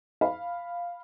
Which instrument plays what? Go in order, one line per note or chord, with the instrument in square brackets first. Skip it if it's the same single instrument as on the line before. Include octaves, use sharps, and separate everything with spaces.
[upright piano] F5 B5